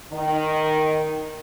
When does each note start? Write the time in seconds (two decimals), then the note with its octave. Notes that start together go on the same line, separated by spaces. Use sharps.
0.13 D#3